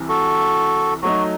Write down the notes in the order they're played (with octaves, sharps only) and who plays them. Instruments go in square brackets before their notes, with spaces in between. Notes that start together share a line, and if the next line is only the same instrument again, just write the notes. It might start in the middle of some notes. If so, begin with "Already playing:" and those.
Already playing: [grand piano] C2 C3 E3
[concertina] F#4 A4
[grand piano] F#3 A3 D#4 [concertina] F#4